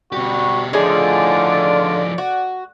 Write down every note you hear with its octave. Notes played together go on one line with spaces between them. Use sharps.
B2 G3 F#4 G4
A2 D3 F3 D#4 F4 G#4 D5 G#5
F#4